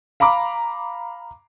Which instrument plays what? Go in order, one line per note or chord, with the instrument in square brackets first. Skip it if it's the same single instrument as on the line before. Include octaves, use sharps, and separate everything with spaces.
[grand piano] F5 A#5 B5 D6